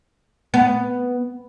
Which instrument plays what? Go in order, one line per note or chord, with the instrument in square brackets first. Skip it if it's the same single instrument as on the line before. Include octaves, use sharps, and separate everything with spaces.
[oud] B3